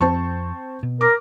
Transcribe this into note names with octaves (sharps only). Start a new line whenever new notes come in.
F2 C4 A5 C#6
B2
A#4 D6